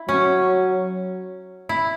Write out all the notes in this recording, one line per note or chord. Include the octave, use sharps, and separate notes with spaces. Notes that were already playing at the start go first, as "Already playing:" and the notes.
Already playing: E4
F#3 C#4
E4